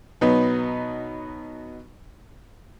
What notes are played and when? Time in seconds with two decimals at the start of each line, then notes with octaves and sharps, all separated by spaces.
0.21 B2 F#3 B3 D#4